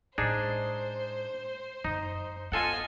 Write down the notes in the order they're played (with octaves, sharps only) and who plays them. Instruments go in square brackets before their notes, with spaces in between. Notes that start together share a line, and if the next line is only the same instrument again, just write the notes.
[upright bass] A2 G#3 [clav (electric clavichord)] D4 D#4 G#4 [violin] C5
[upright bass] F#2 [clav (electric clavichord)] D#4
[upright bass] B3 [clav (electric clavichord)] F4 A4 F#5 [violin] D#5 G#5